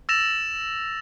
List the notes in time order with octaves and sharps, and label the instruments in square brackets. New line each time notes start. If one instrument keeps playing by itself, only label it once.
[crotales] E6 A6 A#6 E7 F7